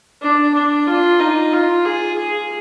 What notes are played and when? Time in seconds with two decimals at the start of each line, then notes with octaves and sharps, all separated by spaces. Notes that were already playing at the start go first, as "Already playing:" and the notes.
0.22 D4
0.55 D4
0.87 F4
1.20 D#4
1.53 F4
1.85 G#4
2.18 G#4